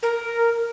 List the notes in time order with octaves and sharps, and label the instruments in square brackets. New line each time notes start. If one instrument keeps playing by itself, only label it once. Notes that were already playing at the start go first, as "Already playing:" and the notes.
[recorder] A#4